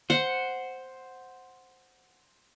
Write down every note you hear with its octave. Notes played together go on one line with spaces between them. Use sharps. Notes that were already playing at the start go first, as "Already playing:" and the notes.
C5 F#5